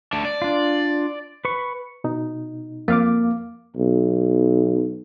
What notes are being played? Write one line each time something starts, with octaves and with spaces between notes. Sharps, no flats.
A3 D4
D5
D4 F4
B4 C#6
B2 D#4
F2 A#3 F5 D6
B1